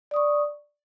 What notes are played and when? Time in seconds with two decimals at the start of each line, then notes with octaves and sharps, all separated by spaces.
0.11 D5
0.14 D#6
0.16 C#6